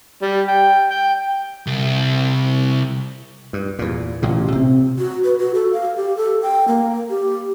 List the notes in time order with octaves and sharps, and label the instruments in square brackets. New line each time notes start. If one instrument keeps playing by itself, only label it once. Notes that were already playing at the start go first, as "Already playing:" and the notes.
[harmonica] G3
G5
G5
[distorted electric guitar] C2
[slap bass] G2
E2 A#2
A1 A#2 C#3
C3 C4
[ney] F#4
B4
F#4
A4
F5
G4
A4
G5
A#3
G4